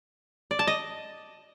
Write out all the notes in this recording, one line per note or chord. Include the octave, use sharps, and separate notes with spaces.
D5
A5
D#5